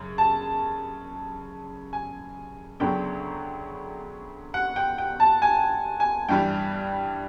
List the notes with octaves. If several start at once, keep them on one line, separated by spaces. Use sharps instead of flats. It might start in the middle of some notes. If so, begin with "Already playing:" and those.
Already playing: F#2 C#3
A5
G#5
D2 C#3 F#3 B3 D4 G5
F#5
G5
G5
A5
G#5
G#5
G2 E3 G3 G5